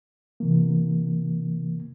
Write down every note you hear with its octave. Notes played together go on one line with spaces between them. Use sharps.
C3 E3 A#3